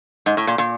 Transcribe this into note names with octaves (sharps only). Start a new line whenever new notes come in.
G#2
A2
A#2
A#2